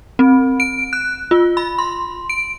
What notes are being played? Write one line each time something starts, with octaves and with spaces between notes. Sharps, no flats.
C4
D7
F#6
F4
B5
C6
D7